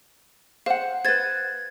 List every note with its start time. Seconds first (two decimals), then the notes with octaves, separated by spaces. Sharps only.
0.66 C5 F5 F#5
1.05 B4 C5 G#6 A6